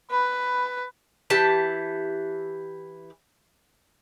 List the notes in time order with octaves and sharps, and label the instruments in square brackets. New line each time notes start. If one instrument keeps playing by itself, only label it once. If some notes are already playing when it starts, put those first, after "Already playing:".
[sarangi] B4 [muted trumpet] B5
[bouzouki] E3 G4 A5